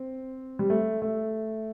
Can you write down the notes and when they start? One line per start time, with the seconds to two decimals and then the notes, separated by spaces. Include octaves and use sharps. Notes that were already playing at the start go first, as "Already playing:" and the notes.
Already playing: C4
0.59 G3
0.70 A3
1.02 A3